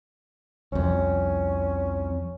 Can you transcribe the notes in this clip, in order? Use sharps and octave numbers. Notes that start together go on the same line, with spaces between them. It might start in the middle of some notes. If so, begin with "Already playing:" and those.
C2 F2 C#4